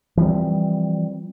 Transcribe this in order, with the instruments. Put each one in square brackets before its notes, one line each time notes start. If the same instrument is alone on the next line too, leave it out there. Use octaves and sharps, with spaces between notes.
[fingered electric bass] E3 F3 G3 C4